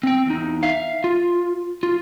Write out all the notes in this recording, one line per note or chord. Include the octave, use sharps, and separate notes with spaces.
C4 G5
E2 D#4
E5 F5
F4
F4